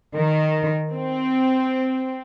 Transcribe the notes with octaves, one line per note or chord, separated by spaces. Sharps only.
D#3
C4